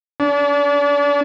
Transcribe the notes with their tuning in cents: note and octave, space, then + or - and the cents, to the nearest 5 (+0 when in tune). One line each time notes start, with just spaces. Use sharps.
D4 -35